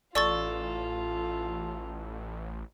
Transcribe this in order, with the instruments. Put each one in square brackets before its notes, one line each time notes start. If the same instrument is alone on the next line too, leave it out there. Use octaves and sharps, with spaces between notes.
[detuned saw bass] A1 [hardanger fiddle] F4 [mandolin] A4 [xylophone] D5 C#6 A6